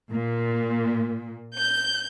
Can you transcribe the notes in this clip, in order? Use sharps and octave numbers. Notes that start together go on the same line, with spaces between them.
A#2
G6